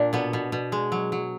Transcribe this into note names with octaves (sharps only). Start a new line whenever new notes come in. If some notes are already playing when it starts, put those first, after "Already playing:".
Already playing: A#2 D4
B2 B3
B2
B2
G#3
F#3
F#3